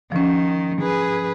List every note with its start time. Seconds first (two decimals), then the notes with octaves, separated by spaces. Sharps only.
0.12 D#3 F3 C#4
0.82 G#4 B4